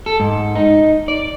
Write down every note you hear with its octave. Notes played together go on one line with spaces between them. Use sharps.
A4
G#2
D#4
D5